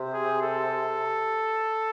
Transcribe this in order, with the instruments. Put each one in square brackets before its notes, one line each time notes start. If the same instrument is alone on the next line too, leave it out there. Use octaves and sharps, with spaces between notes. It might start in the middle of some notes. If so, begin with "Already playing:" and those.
Already playing: [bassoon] C3
[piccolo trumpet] G#4
A4